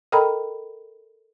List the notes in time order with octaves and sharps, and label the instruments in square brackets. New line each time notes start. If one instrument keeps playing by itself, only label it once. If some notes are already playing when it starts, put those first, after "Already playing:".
[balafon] A4 A#4 D#5 G5 A#5 B5